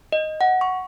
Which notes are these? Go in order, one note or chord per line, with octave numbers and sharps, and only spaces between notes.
D#5
F#5
C#6